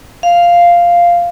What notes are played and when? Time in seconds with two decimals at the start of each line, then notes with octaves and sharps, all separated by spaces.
0.23 F5